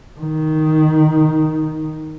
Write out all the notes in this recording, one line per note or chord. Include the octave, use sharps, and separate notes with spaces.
D#3